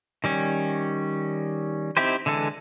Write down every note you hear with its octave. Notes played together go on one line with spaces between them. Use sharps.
D#3 G3 C#4
C4 D#4 E4 G4 C5
D3 E3 G#3 A4